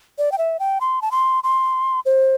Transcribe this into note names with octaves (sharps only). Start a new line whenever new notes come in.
D5
G5
E5
G5
C6
A5
C6
C6
C5